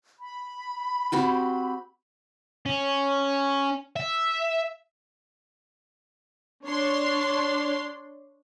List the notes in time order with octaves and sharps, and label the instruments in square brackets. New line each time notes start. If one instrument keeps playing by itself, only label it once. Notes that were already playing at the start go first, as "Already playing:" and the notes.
[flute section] B5
[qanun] C4 F#4 G4
[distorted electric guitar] C#4
E5
[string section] D4 C#5 C6